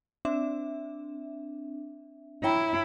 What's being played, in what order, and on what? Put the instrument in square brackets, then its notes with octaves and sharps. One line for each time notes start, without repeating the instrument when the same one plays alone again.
[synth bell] C4 D4 E5
[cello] E4 [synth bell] C#5 G5 A#5